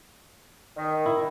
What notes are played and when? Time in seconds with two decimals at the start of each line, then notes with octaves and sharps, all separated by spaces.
0.76 D#3
1.06 E4